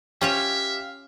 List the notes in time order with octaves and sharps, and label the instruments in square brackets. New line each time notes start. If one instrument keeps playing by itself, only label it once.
[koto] C#4 F4 C#5 [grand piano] G4 [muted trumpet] E5 [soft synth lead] F5